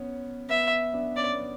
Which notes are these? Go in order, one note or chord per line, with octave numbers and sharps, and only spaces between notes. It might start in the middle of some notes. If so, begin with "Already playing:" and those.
Already playing: B3 C#4
B3 E5
B3 D4
C#4 D5
B3